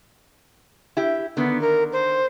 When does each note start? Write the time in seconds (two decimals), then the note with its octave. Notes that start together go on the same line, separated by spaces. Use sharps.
0.97 E4 G4
1.37 D3 D#3 B3
1.61 A#4
1.93 C5